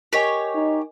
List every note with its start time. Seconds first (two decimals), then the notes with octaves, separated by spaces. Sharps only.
0.13 G4 A#4 C#5 D#5 G#5
0.55 D#4